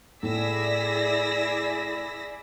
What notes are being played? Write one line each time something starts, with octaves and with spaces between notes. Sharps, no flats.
A2 E4 G#4 D5 E6 A#6 B6